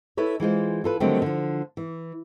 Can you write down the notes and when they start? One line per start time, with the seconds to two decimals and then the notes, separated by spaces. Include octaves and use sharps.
0.17 E4 A4 B4 C#5
0.40 E3 G#3 F4 C5
0.84 F4 A4 B4
1.00 D3 D#3 F#3 G3 A3 C4
1.22 D3 F3
1.77 E3